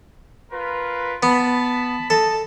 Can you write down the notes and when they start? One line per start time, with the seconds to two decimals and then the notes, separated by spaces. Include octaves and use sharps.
0.51 F4 A#4 B4
1.23 B3 A5 B5
2.10 A4 D#5 A5